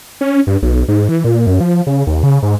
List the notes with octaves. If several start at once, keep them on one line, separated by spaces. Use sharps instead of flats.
C#4
G2
B1
G#2
E3
A#2
F#2
F3
C#3
D#2
C#3
G#2